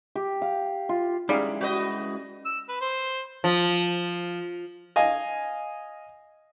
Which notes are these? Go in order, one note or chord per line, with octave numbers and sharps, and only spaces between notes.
G4
F5
F4
G3 G#3 C#4 D#4 E4 G#4 F5
F#4 B4 D#5
E6
B4
C5
F3
D#5 F5 G#5